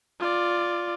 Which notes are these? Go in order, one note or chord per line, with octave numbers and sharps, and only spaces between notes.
F4 D5